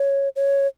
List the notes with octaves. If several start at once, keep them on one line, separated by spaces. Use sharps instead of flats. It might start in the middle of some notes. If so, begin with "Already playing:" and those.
Already playing: C#5
C#5